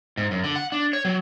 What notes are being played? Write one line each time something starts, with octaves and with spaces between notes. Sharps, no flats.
G#2
F#2
D3
F#5
D4
C#5
F#3